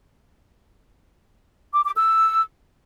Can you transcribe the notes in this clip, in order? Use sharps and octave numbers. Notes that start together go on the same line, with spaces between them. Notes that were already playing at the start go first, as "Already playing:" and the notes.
D6
D6
E6